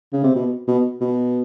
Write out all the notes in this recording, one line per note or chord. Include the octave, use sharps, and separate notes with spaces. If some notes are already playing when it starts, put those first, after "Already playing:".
C#3
C3
B2
B2
B2